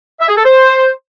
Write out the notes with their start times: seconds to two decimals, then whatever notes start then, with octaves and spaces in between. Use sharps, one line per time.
0.21 E5
0.29 G#4
0.37 A4
0.45 C5